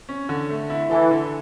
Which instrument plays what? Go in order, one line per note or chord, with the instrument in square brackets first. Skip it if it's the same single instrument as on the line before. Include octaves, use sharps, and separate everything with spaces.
[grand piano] C#4
D3
A3
E4
[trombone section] E3 [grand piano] A4
[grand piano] D3